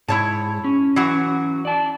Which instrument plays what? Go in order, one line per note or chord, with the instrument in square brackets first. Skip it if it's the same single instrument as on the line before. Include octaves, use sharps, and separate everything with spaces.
[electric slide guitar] G#2 [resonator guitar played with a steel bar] E4 C#5 A5
[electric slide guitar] C#4
[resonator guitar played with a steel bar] E3 F#3 F#4
[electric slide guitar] D5 A5